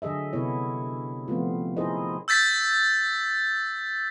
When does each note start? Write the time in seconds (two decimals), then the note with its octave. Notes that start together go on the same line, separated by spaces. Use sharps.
0.02 D3 F#3 G#4 D#5 E5
0.33 C3 B3 E4 C#5
1.28 F3 A3 B3 C4 F4
1.77 D#4 E4 G#4 A#4 C5 D#5
2.28 E6 G6 A6 B6